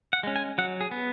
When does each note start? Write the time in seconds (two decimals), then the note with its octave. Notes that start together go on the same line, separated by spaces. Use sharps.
0.13 F#5
0.23 G#3 C#4
0.36 G#5
0.58 F#3 F#5
0.81 G#4
0.91 B3